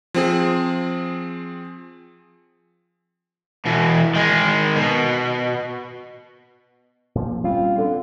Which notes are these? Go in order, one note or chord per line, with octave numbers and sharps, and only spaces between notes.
F3 C4 G#4
E2 B2
D#3 G#3
B2
A#2 F3
G3 C4 C#4 F4
D3